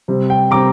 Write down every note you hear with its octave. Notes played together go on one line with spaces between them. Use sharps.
C3 G3 C4
G5
C3 G3 C4 A#5 D6